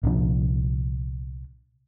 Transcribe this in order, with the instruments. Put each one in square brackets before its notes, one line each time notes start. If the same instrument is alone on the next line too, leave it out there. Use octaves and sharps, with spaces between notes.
[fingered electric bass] C2 A#2 F3 D4